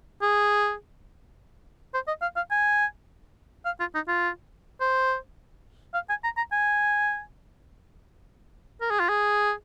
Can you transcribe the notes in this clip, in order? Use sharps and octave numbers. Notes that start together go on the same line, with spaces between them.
G#4
C5
D#5
F5
F5
G#5
F5
F4
D#4
F4
C5
F5
G#5
A#5
A#5
G#5
A#4
G#4
F4
G#4